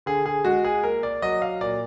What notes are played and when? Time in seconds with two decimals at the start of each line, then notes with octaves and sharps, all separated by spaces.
0.06 D3 G#4
0.26 G#4
0.45 G#3 F#4
0.65 G#4
0.83 A#3 A#4
1.03 D5
1.22 F#3 D#5
1.42 F5
1.61 A#2 D5